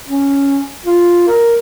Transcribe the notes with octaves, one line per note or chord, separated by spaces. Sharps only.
C#4
F4
A#4